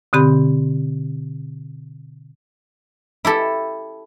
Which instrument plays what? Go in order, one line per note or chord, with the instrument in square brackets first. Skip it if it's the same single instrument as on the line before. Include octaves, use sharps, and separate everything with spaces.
[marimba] B2 D3 C4 G4 B5
[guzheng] E4 G4 A4